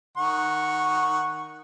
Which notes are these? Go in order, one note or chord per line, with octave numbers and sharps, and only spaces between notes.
D#3 F#5 C#6